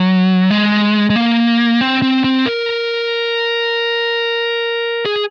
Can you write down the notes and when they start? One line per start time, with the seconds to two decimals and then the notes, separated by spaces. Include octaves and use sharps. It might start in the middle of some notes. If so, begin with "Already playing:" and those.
Already playing: F#3
0.50 G#3
1.10 G#3
1.16 A#3
1.81 C4
2.02 C4
2.24 C4
2.46 A#4
5.06 G#4